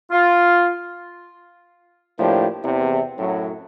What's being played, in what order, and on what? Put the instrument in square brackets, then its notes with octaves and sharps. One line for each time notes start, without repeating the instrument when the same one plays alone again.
[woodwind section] F4
[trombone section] A2 F3 A#3 D4 G4
E2 C3
F#2 A2 F#3